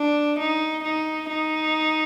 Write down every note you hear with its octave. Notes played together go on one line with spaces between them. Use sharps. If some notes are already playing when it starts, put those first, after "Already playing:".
Already playing: D4
D#4
D#4
D#4